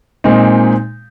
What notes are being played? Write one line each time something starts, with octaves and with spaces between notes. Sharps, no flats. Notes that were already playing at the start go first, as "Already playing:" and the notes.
A#2 G#3 C4 D#4